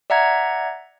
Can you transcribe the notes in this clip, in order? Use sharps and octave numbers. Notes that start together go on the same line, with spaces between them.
D5 E5 F#5 A#5 G#6